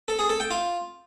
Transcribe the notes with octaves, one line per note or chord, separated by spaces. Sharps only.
A4
G#4
A4
G5
F4